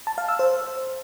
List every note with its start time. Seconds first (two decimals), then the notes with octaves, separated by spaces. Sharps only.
0.07 A5
0.18 F5
0.29 E6
0.39 C5